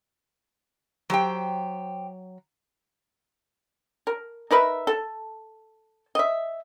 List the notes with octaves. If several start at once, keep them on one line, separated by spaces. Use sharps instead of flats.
F#3 G4 C5 G5
A#4
D#4 A#4 B4 E5
A4
D#5 E5